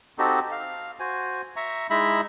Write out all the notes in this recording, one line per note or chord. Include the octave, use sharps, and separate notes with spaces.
C4 D#4 F#4 G4 A4
F5
F#4 C5 G#5
E5 A#5 C#6
G#3 D#4 E4 E5 A#5 B5